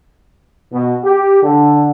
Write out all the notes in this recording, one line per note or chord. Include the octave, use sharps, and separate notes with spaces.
B2
G4
D3